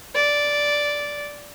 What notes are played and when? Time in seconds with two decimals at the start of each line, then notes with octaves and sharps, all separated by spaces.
0.15 D5